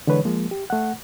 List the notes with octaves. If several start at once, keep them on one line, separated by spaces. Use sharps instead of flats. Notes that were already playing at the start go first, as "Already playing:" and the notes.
D3 E3 G#3 B4 C#5
F3 G#3 A#3
G4
A3 F#5